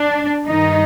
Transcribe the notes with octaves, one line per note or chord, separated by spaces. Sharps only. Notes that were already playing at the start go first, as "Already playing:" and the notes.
Already playing: D4
G2 D#3 D#4